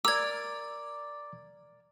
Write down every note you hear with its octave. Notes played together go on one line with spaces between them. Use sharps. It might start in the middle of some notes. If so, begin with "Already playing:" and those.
A#4 D5 D6 E6 G#6